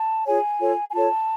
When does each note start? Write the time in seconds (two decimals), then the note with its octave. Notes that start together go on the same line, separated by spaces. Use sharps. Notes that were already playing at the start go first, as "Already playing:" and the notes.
Already playing: A5
0.26 F4 G#4 C#5 G#5
0.59 F4 A4 C#5
0.88 G#5
0.93 F4 A4 C#5 A5